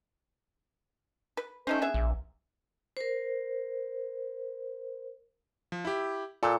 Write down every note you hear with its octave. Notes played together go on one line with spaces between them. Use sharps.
B4
A3 C#4 D#4 C5
B3 G#4 E5
A#1
A#4 C5
F3
E4 G4
A#2 A4